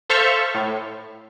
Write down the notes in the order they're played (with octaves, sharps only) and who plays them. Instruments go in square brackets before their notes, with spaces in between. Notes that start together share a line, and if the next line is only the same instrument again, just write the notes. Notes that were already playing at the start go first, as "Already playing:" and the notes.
[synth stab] A4 C5 E5 F5 C#6 F6
A2